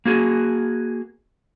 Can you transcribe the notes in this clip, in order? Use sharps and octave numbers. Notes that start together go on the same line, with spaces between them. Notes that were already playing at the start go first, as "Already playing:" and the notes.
A#3 F#4 G#4